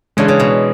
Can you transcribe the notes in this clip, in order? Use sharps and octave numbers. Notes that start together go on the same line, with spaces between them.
C#3 E3 G#3 D4 G#4
C#3
B2